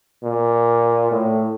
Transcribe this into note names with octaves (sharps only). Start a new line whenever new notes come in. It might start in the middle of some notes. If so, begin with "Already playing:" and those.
A#2
A2